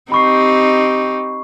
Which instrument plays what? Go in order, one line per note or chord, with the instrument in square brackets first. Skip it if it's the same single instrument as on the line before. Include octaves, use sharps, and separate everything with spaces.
[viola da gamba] C4 D#4 G4 [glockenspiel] B5 C#6 C7